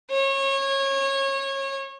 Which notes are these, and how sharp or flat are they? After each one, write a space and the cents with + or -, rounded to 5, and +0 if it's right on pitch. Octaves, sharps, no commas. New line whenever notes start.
C#5 -25